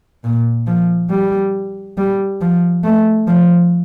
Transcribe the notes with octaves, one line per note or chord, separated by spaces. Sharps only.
A#2
F3
G3
G3
F3
A3
F3